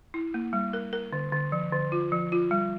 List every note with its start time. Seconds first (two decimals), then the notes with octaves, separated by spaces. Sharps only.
0.14 E4
0.34 A#3
0.53 G3
0.73 A#4
0.93 A#4
1.13 D3
1.32 D3
1.52 F3
1.72 D3
1.92 F4
2.12 F3
2.32 F4
2.51 G3